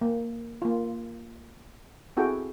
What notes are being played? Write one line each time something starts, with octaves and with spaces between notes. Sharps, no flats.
A#3
A#3 F4
C4 E4 F#4 G#4 A4 G5